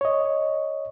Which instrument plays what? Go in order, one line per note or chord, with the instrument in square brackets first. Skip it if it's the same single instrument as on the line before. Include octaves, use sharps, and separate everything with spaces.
[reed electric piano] C#5 D#5